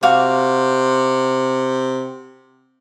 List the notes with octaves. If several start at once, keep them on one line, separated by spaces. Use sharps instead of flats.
C3 F#4 F5 D6